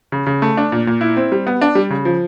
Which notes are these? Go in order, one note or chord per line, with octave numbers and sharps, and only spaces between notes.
C#3
C#3
A3
D4
A#2
A#2
E4
C4
G3
B3
D4
G3
C#3
F3